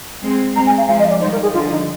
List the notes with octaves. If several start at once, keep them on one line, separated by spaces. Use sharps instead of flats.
G#3 C4
G#3 C4 A#5
G#5
F5
F3 G#3 F5
D#5
D5
D#3 G3 C5
A#4
G#4
D3 F3 F4
D#4